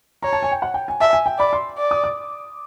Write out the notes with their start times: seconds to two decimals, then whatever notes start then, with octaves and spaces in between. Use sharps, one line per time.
0.23 C#5 A#5
0.33 A5
0.43 G#5
0.52 G5
0.62 F#5
0.74 G5
0.88 G#5
1.00 E5 A5
1.13 G#5
1.26 G5
1.39 D5 B5
1.53 C6
1.78 D5
1.91 D#6
2.04 D6